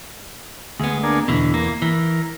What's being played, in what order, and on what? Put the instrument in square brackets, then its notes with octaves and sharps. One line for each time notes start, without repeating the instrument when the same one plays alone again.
[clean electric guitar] D2 B3 [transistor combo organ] G#3
[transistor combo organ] A#3 D4 G#4
[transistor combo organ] E2 [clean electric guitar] B2 D3
[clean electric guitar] A#3
[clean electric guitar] E3 [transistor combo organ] A#4